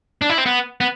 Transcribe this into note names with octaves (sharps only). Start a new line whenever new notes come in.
D4
E4
C4
B3
B3